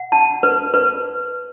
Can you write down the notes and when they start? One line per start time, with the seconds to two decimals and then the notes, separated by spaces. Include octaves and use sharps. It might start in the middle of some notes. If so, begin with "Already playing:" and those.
Already playing: F#5
0.12 A5
0.43 B4
0.74 B4